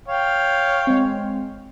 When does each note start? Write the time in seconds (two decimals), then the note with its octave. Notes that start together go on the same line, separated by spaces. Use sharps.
0.08 C#5 F5 G5
0.87 G#3 C4